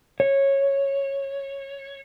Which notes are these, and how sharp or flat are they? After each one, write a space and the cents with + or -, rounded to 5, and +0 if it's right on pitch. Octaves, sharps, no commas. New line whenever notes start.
C#5 -10